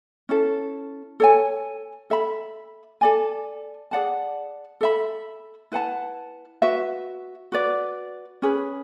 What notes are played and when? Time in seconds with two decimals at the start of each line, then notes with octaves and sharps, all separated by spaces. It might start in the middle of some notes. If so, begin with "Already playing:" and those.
0.29 C#4 E4 A4
1.20 A4 C#5 G#5
2.10 A4 E5 B5
3.01 A4 D5 G#5
3.91 G#4 D5 F#5 A5
4.81 A4 E5 B5
5.72 E4 B4 F#5 A5
6.62 F#4 B4 E5
7.52 F#4 B4 D5
8.42 C#4 G#4 B4